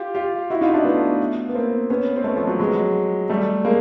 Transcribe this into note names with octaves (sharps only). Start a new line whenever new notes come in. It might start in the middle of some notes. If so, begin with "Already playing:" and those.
Already playing: F4 G4
F4 G4
E4 F#4
D#4 F4
D4 E4
A3 B3
B3
A#3 C4
B3 C#4
C4
A3 B3
F3
F#3
F#3 G#3
G3 A3
G#3 A#3